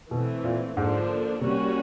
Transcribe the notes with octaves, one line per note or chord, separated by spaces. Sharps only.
B2 E3 A3 C4
A#2
G#2 D3 F3 A#3 D4
C3 G3 A#3 C#4 F#4